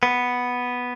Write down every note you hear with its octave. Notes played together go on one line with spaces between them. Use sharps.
B3